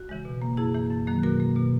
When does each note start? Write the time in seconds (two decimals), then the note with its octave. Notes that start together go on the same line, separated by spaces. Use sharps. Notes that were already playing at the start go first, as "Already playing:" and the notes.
Already playing: F#4
0.09 C#3 E3 G#3
0.25 B2
0.42 A#3
0.57 F#2 E4 G#4
0.74 E3 A#3
0.90 F#2
1.07 D#3 F#3 A#3
1.23 B2 F#4 A#4
1.40 A#3
1.56 B2